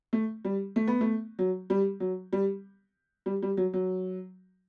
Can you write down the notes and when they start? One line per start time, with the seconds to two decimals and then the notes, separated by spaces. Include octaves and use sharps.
0.13 A3
0.45 G3
0.76 A3
0.87 B3
1.01 A3
1.39 F#3
1.70 G3
2.00 F#3
2.33 G3
3.26 G3
3.43 G3
3.57 F#3
3.74 F#3